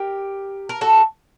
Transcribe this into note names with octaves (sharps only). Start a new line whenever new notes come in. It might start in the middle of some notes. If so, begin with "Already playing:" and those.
Already playing: G4 A#4
A#4
F#4 A4